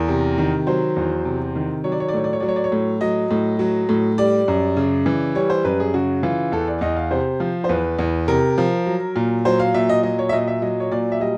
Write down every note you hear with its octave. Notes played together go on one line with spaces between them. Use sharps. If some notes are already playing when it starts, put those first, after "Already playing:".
Already playing: E2 A#4
C3
D#3
F#3 C5
E2
C3
D#3
F#3 C#5
D5
C#5
D5
A2 C#5
D5
C#5
F#3 D5
C#5
D5
C#5
A2
F#3 D#5
A2
F#3
A2
G3 D5
F#2
C#3
E3
G3 C#5
C5
F#2 B4
G#4
C#3 F#4
E3 F4
E2 A4
D5
E2 D#5
F5
C3 C5
F3
C5
E2 B4
E2
C3 A#4
F3
F#3
A#2
F#3 C5
F5
A#2 E5
D#5
F#3 D#5
C#5
E5
A#2 D#5
E5
F#3 D#5
C#5
A#2 D5
E5
G3 D#5